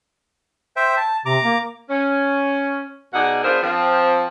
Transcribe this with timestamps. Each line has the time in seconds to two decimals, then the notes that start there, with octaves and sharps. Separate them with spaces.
0.76 C5 E5 G5
0.97 A5
1.26 C3 A#5 D6
1.43 A#3
1.90 C#4
3.14 B2 D#4 G#4 D5 F#5
3.44 B3 D4 F4 G#4 A#4 C5
3.62 F3 C4